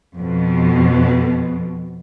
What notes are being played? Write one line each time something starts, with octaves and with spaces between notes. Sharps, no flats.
F2 B2